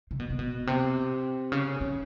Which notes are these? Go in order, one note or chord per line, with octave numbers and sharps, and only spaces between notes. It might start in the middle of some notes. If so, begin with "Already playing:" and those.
C3
B2
C3
B2
C3
C#3
D#3